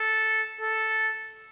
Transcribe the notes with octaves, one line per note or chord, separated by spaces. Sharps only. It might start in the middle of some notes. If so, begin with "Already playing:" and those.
Already playing: A4
A4